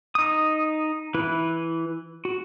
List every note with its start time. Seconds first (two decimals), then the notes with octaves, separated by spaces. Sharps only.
0.15 D#4 D#6
1.14 E3 E4 B4
2.25 F#4